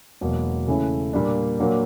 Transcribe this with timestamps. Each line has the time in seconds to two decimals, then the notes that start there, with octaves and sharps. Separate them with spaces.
0.21 E1 E2 B2 F#3 A#3
0.67 C#3 E3 A3 C#4 E4
1.13 A#2 G3 A#3 D4
1.59 A#2 F#3 A#3 D4